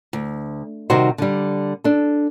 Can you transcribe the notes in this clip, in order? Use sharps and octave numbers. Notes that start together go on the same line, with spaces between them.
D2
C3 D#3 G3 D#4 F#4 C5
D3 G3
D4 A4